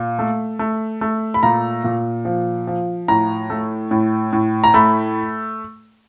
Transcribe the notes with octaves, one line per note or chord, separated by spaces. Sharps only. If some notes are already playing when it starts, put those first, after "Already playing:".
Already playing: A#2
A3
A3
A3
B5
A#2 A#5
A#2
F3
F3
A2 A#5
A3
A2
A2
A#5
A3 B5